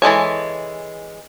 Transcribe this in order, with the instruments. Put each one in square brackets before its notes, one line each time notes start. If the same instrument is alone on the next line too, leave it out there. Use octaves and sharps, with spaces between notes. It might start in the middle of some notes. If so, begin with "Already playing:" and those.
[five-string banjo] E3 G#3 A4 C#5